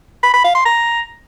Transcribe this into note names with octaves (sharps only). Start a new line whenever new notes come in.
B5
B5
F5
C6
A#5